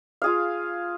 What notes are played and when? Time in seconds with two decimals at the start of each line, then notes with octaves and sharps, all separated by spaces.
0.22 F4 G#4 F5